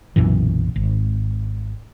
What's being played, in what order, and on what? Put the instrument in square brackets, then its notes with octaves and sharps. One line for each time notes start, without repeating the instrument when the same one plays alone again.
[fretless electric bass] B1 F#2 A#2 E3
G#1